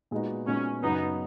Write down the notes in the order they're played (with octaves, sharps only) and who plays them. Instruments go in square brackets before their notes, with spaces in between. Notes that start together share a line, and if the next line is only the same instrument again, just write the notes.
[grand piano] A#2 G#3 B3 D#4 F#4
[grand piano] A#2 G#3 B3 D#4 F#4 [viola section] C#4
[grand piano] F#2 C#3 F#3 [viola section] B3 D#4